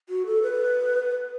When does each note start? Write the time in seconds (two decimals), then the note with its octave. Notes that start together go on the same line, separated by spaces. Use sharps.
0.09 F#4
0.26 A4
0.42 B4